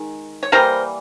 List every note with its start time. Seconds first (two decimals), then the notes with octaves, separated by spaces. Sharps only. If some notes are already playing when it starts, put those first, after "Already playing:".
Already playing: D#3 G#3
0.43 C#5
0.52 E3 G3 A#3 A#4 C5